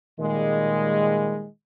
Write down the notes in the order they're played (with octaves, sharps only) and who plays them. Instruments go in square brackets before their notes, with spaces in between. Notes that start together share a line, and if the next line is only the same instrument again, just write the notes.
[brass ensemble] A#2 D#3 G3 G#3